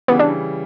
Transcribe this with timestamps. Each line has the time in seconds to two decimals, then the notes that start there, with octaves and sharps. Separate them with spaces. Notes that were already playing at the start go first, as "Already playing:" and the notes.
0.08 C#3 E3 G3 B3
0.19 D4